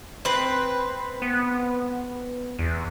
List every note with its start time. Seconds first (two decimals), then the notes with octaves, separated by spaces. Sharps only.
0.25 C4 B4
1.22 B3
2.59 E2